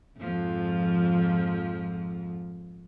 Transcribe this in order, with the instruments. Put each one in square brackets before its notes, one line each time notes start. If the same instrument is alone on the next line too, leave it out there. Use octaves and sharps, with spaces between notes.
[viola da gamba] F2 G#2 F3